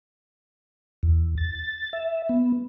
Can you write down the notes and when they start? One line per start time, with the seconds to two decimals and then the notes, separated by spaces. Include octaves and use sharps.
1.03 E2
1.38 A6
1.93 E5
2.29 B3